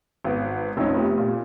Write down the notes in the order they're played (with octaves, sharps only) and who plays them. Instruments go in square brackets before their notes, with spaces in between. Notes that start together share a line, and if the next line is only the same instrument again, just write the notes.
[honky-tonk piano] G#1 B3
[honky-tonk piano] F1 C#4 [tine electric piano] C4 D#4 F4
[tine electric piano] A3 B3 G4
[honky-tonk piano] A#2